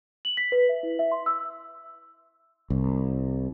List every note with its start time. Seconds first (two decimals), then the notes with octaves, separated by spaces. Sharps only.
0.25 F#7
0.37 B6
0.52 B4
0.69 E5
0.83 E4
0.99 E5
1.12 C6
1.26 E6
2.70 C2